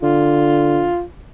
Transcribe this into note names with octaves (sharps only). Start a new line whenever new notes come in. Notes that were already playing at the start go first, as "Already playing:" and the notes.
D3 F4